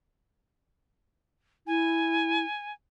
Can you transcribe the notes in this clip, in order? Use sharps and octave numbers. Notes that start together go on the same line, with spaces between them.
E4 G#5